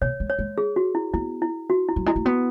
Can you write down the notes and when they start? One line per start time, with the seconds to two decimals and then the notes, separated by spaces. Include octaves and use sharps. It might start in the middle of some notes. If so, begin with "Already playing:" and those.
0.01 B2 C#5
0.20 G#3
0.30 C#5
0.39 G#3
0.58 G#4
0.76 F#4
0.95 E4
1.14 B3 E4
1.42 E4
1.70 F#4
1.89 E4
1.96 F#3
2.06 G#3 E4
2.16 A3
2.25 B3 F#4